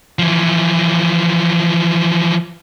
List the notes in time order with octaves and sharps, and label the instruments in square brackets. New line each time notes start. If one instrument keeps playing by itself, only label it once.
[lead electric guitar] E3 F3